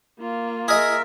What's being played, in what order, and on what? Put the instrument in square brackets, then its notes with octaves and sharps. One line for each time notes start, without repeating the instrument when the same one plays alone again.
[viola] A#3 F4
[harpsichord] G#4 D#5 [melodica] A#4 E5